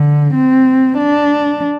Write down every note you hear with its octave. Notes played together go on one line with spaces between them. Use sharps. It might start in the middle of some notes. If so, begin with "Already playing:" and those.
Already playing: D3
C4
D4